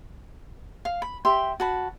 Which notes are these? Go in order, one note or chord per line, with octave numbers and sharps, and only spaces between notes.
F5
B5
G4 E5 G5 C6
F#4 A5 B5